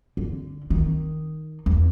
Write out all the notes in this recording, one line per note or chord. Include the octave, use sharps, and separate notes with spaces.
D3
D#3
E2